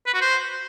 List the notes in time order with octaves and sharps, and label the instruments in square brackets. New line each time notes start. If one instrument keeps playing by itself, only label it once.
[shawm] B4
F#4
C5